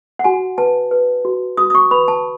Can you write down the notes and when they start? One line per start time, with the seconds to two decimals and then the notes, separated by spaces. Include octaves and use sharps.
0.19 F#5
0.24 F#4 G#5
0.58 B4 A5
0.91 B4
1.25 F#4
1.57 F#4 D#6
1.70 D#6
1.75 C#6
1.91 B4 B5
2.08 A5